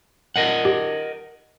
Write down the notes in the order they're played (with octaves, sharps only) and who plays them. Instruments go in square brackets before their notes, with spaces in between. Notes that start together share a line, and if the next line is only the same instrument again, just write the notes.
[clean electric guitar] A#4 D#5 F#5
[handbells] G4